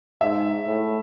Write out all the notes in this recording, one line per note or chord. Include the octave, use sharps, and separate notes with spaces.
G#2 E5
A2